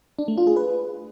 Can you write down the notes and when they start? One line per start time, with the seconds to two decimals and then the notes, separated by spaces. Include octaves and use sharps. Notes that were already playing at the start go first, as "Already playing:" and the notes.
0.19 D4
0.28 A3
0.37 F4
0.47 G#4
0.56 B4